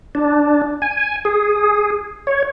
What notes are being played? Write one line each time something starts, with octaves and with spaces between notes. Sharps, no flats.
D4
G#5
G#4
C#5